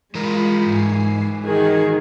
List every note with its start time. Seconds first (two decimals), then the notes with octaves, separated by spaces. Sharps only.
0.15 E3 G#3 F4 A#4 B5
0.64 G#2 G#5 C7
1.45 D#3 F#4 G#4